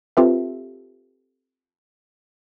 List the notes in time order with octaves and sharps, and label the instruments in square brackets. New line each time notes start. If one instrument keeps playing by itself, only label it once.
[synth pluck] C4 F4 G4 A4 B4 E5